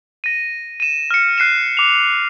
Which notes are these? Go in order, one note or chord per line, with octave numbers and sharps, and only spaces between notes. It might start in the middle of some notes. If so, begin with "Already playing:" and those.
A#6 D#7
D#7 E7
F6 C#7
F#6 C7 D#7 E7
D6 F7